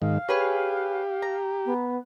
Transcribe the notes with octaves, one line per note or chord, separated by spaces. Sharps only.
G#2 D#3 F5
G4 G#4 B4 C#5
A#5
B3